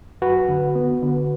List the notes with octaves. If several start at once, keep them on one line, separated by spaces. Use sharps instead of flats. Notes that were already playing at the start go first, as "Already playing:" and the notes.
F#2 F#4 B4
D3
B3
D3